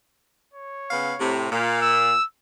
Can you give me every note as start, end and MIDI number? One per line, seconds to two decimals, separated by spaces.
0.54 1.37 73
0.90 1.14 49
0.90 1.14 59
0.90 1.14 77
1.20 1.48 45
1.20 1.48 48
1.52 2.13 46
1.52 1.82 77
1.82 2.25 88